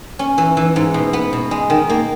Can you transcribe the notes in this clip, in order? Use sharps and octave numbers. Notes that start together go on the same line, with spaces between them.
C#4
E3
E3
G#2
B2
B3
B2
G#3
D#3
A#3